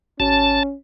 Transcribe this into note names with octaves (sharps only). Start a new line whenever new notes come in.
G#1 C#4 A5